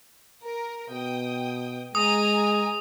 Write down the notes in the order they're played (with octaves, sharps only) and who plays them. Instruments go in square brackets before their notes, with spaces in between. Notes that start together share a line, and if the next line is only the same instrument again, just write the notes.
[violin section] A#4
[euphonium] B2 [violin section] G5 D#6
[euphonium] G#3 [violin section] G#5 A#5 [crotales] D#6